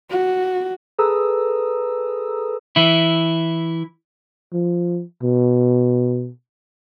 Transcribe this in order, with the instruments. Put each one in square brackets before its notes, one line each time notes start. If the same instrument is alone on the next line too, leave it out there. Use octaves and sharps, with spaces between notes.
[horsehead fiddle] F#4
[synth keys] G#4 A4 B4 A#5 D#6 E6
[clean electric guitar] E3 E4
[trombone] F3
B2